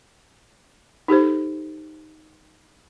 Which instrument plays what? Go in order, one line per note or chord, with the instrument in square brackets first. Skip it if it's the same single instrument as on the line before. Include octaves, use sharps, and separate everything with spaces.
[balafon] D#4 G4 A4 C5